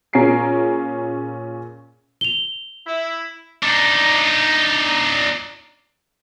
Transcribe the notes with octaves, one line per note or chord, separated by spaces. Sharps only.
A#2 C#4 G#4 A#5 C7 D7
F7 G7
E4
D4 D#4